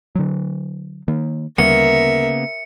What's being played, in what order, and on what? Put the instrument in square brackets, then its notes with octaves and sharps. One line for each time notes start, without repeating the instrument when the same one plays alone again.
[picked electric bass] D3 F#3
D#3 A#3
[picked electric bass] D2 G3 [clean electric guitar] C#3 A#3 B3 [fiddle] A#4 E5 [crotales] C#7